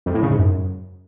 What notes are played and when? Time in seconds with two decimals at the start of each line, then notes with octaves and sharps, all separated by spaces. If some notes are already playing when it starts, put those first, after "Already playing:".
0.06 F2
0.14 A2
0.22 C#3
0.31 G#2
0.39 F#2